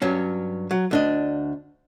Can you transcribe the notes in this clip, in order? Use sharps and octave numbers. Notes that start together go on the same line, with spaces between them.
G2 F#3 C#4
F#3
D2 D4 D#5